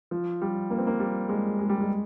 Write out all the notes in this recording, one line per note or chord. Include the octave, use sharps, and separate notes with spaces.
F3
G3
A#3
C4
A#3
G3
G#3
G#3
G3
G#3